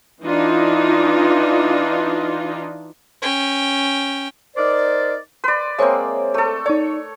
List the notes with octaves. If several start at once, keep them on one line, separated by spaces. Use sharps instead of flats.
E3 D4 D#4 F4
C#4 G5
D#4 A#4 C5 D5
B4 D5 C6
G#3 A#3 C4 C5 C#5 E5
A3 A4
D#4 C#5 D5